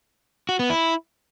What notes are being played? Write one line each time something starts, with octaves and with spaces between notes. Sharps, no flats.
F#4
B3
E4